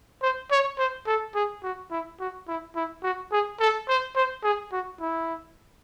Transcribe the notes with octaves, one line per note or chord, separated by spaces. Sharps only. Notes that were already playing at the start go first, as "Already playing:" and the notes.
C5
C#5
C5
A4
G#4
F#4
E4
F#4
E4
E4
F#4
G#4
A4
C5
C5
G#4
F#4
E4